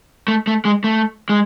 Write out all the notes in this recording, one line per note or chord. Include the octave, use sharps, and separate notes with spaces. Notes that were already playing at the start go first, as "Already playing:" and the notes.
A3
A3
G#3
A3
G#3